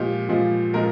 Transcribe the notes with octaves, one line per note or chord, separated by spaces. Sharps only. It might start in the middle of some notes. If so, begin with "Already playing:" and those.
Already playing: A#2 F3 G#3 G4
A#2 F3 G#3
A#2 F3 G#3 A#4